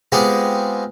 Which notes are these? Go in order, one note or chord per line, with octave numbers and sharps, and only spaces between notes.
G#3 B3 C4 F4 G4 G#4